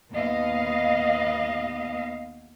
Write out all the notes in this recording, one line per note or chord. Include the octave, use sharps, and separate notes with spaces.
D#2 B3 D#5 F5